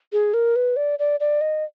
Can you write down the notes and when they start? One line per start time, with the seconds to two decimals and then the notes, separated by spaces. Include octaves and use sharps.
0.13 G#4
0.34 A#4
0.56 B4
0.76 D5
0.99 D5
1.20 D5
1.41 D#5